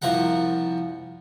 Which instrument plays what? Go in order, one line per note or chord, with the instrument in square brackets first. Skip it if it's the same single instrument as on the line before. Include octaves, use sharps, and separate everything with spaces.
[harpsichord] C2 F3 A#4 F#5